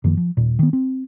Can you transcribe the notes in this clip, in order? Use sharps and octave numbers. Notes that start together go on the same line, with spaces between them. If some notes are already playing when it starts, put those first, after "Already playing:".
F#2 D#3 F3 A#3
F3
D#1 A#2
D#3 B3
C4